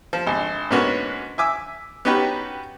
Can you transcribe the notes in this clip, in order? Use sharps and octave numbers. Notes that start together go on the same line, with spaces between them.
F3
G#1 D3
G#2 D3 A#3 B3 C#4 F#4
E5 G#5 D6 E6
B3 C#4 D#4 F#4 G4 B4